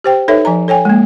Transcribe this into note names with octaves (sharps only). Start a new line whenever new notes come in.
G4 C5 G5
D#4 A4 B4 C#5 E5
F3 G#5 A#5
A4 C#5 G5 G#5
G#3 A#3